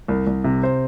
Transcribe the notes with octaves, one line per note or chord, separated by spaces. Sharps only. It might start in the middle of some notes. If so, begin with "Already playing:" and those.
C2
C2
C3
C5